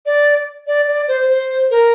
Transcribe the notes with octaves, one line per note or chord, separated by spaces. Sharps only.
D5
D5
D5
C5
C5
A#4